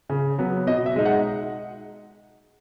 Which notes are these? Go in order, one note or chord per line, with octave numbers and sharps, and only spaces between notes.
C#3
F#3 B3
B2 D#5
E5
G#3 D#4
F#5